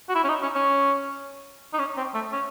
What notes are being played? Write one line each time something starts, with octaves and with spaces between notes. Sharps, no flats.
F#4
E4
C#4
D#4
C#4
C#4
D#4
C#4
C4
A3
C#4